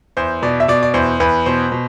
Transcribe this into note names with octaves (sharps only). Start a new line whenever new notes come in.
E2 C5
B2 D5
E5
B2 D5
D5
E2 C5
E2 B4
B2 C5
B2